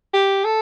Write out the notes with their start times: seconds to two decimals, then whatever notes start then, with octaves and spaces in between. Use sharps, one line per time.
0.14 G4
0.45 A4